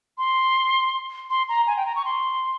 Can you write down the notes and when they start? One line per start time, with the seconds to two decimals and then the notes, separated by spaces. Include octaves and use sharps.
0.18 C6
1.30 C6
1.49 A#5
1.67 G#5
1.77 G5
1.86 A#5
1.96 C#6
2.05 C6